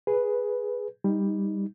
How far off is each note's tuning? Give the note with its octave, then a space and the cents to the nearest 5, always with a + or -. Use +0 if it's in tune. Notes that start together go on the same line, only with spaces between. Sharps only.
G#4 +0 B4 -5
G3 +15 D#4 +10